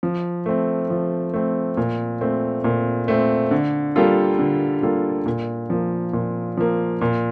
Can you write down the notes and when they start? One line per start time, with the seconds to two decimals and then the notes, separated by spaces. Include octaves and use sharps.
0.03 F3
0.46 A3 C4
0.90 F3
1.34 A3 C4
1.77 A#2
2.21 A3 C4
2.64 A#2
3.08 A3 C4
3.51 D3
3.96 G3 A#3 F4 A4
4.39 D3
4.82 G3 A#3 F4 A4
5.26 A#2
5.70 F3 A#3
6.13 A#2
6.57 F3 A#3
7.01 A#2